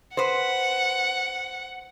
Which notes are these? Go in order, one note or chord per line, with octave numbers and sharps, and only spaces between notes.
B4 C5 F#5